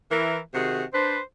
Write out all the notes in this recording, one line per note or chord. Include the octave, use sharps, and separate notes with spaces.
E3 A#4
C3 D#3 F#4 G#4
D4 B4 C5